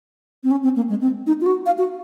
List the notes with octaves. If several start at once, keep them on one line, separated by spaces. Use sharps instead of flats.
C4
C#4
C4
A#3
G#3
C4
D#4
F4
F#4
F5
F#4